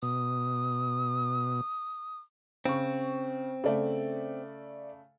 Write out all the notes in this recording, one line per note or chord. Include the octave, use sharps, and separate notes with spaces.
B2 D#6
C#3 C4 C#6
C#3 A3 A4 D5 E5